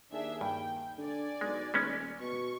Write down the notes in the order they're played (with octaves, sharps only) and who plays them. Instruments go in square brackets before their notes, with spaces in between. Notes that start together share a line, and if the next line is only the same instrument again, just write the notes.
[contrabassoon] D#2 [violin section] D4 G#4 E5
[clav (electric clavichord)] G2 [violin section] G5
[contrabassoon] D3 [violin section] D5 G#5
[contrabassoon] B1 [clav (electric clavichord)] G#3
[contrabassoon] D#1 [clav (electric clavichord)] G#3 B3 C#4
[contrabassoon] B2 [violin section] C#6